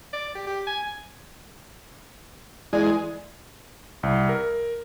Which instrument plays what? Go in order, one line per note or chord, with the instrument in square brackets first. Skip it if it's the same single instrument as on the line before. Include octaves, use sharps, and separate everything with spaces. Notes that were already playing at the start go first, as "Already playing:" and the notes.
[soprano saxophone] D5
G4
G4
G#5
[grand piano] E3 [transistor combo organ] G#3 [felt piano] D5 G#5
[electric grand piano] C2
A#4